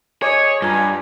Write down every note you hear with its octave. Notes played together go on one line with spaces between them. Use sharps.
C#5 D#5 G#5 D6 D#6
G#4
G2 F4 G#5 A#5